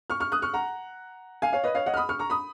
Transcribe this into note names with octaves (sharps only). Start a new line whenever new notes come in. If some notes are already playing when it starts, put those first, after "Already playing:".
C#6 F6
C#6 F6
D#6 F#6
C#6 F6
F#5 A#5
F5 G#5
C#5 F5
B4 D#5
C#5 F5
D#5 F#5
F6
B5 D#6
C#6 F6
A#5 C#6
B5 D#6